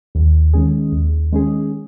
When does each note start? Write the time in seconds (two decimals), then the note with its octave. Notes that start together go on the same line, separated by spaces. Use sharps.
0.15 D#2
0.53 D#3 G#3 C#4 G#4
0.92 D#2
1.32 D#3 G#3 C#4 G#4